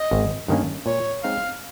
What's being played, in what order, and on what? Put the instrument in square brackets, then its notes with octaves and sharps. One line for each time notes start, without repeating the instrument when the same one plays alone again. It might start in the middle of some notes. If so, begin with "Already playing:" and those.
Already playing: [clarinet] D#5
[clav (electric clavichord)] G#1
G2 D#3 A#3 C#4
[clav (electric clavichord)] A#2 [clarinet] C#5
[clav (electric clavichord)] G#3 C4 D#4 [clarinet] F5